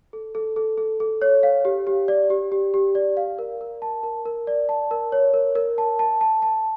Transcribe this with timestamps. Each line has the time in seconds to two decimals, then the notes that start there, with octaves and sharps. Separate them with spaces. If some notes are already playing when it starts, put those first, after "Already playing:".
0.13 A4
0.35 A4
0.56 A4
0.78 A4
1.00 A4
1.22 C#5
1.43 F5
1.65 G4
1.87 G4
2.08 D5
2.30 G4
2.52 G4
2.74 G4
2.95 D5
3.17 F5
3.38 A#4
3.61 A#4
3.82 A5
4.03 A#4
4.26 A#4
4.47 D5
4.69 A5
4.91 A#4
5.12 C#5
5.34 A#4
5.55 A#4
5.78 A5
5.99 A5
6.21 A5
6.42 A5